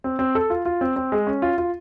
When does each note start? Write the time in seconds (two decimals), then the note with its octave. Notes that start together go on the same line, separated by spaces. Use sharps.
0.04 C4
0.19 C4
0.35 A4
0.50 F4
0.65 F4
0.81 C4
0.96 C4
1.12 G#3
1.27 C#4
1.42 F4
1.58 F4